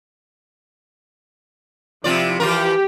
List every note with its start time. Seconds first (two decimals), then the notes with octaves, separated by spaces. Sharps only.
2.04 C3 F3 E4 F4 D5
2.40 E3 F4 G4 A#4